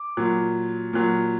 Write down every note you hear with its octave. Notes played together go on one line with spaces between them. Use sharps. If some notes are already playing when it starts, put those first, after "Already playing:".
Already playing: D6
A#2 F#3
A#2 F#3